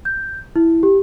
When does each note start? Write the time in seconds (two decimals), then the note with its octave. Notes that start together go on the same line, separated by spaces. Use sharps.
0.05 G6
0.56 E4
0.83 G4